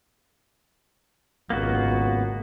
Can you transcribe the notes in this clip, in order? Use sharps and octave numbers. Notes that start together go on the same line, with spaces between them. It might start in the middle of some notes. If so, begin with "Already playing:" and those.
G#1 C#2 A#3 B3 F#4